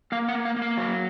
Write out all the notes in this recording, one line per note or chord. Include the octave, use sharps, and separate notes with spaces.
A#3 F5
F#5
A#3
F5
A#3
F5
F#3